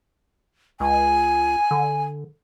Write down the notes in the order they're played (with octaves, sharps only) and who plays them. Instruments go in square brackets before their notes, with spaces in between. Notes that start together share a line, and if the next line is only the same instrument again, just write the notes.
[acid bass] C#2 [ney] G#5
[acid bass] D3